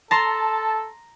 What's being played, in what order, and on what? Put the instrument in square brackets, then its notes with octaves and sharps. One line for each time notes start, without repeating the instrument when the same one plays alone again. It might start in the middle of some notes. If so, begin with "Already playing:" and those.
[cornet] A4 [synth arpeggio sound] A5 [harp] A#5 C6